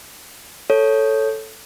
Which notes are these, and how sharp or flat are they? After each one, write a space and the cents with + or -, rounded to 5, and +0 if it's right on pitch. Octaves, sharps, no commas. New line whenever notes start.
A4 +0 C#5 +0